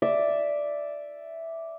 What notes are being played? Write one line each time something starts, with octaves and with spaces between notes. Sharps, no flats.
D5 E5